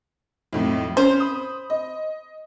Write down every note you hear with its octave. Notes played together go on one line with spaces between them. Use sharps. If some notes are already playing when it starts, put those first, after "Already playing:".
B1 F2 A2
C#4 C5
B5 D#6
D#5